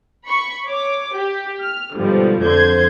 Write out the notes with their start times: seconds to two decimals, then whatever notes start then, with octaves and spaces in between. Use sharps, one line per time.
0.27 B5 C#6 C#7
0.68 C#5 D6
1.16 G4
1.62 F6
1.96 G#2 B2 D3 F3 G3
2.42 F2 D3 C5 G6 G#6